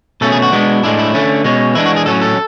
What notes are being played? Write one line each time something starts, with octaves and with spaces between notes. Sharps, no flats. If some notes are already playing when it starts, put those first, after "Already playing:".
B2 A3 C#4 A4
G#4
F#4
B2 G#3 B3 D4
A2 G#3 D4 E4
E4
D3 A3 C#4
B2 G#3 C#4
E3 G#3 B3 D4 E4
F#4
G#4
A2 F#3 C#4 A4
A4